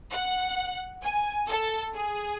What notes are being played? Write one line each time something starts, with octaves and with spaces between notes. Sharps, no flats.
F#5
G#5
A4
G#4